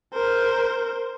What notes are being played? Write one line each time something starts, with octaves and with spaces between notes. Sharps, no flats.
A#4 C5